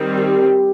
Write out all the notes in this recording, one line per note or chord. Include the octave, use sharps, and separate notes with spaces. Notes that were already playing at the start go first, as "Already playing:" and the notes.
Already playing: D#3 G3 C4
G4